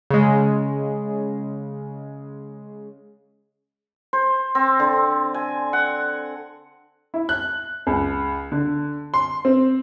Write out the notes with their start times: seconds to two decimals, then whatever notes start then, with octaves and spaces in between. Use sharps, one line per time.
0.10 C#3 G#3
4.13 C5
4.55 C4
4.80 D3
5.34 G#5
5.73 F#5
7.14 E4
7.29 F#6
7.87 C#2
8.52 D3
9.14 C6
9.45 C4